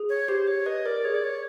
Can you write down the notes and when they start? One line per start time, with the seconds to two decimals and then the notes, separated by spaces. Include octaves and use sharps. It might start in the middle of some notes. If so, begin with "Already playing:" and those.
Already playing: G#4
0.09 C#5
0.28 G4 C5
0.47 C5 C#5
0.66 B4 D#5
0.86 A#4 D5
1.04 G#4 C#5
1.14 D5
1.24 C#5